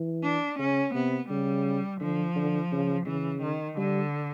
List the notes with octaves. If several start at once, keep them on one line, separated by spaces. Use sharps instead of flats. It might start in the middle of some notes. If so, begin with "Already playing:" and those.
Already playing: E3
D4
C#3 C#4
C3 B3
C#3 G3
D3 F3
D3
C#3
C#3 E3
D#3
D3 G3